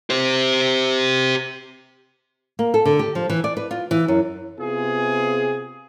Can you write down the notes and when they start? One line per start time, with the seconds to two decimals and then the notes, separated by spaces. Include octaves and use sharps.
0.10 G4 C5
2.59 A#3
2.74 A4
2.85 D3
2.99 G4
3.15 F3
3.30 E3
3.44 D5
3.57 B4
3.71 F4
3.91 E3
4.08 F#2
4.59 C3 B3 F4 G#4